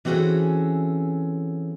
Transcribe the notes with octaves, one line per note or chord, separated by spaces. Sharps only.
E3 C4 C#4 F#4 G#4 A4